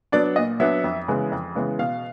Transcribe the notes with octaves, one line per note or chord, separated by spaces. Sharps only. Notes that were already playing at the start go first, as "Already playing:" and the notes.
F#3 B3 D4 D5
A#2 D#5
F#3 B3 D4 E5
F2
C#3 E3 G#3 B3
F2
C#3 E3 G#3 B3
B2 F5